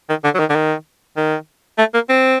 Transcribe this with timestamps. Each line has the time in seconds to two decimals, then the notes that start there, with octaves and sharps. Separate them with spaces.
0.09 D#3
0.24 D3
0.35 F#3
0.39 D#3
0.50 D3
0.55 D#3
1.17 D#3
1.78 A3
1.94 A#3
2.09 C4